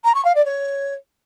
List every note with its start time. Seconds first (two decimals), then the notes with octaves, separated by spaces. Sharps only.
0.04 A#5
0.14 C#6
0.25 F5
0.35 D5
0.45 C#5